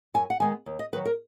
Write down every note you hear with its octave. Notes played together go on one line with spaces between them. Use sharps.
F#2 G#5
F#5
D#3 G#3 B3 G#5
D#2
D#5
D#3 F#3 B4
A#4